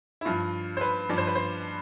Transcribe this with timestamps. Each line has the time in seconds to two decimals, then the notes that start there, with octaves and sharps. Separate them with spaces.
0.21 E4
0.25 G2 F3 F4
0.77 C5
0.81 B4
1.09 G2 F3 D5
1.18 C5
1.27 B4
1.35 C5